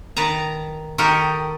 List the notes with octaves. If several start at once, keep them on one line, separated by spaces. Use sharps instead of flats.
D#3 B4 A5 A#5
D#3 F#4 G4 A4 A#4 D#5